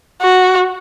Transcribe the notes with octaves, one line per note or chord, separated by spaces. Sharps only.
F#4